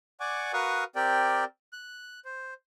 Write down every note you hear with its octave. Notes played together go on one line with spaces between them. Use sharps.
D5 F#5 G#5 C#6 D6
F#4 A#4 B4 F5 C#6 D#6
C4 G4 A#4 D5 G5
F#6
C5